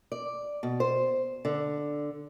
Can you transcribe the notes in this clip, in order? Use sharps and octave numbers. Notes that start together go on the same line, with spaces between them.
D5
B2
C5
D3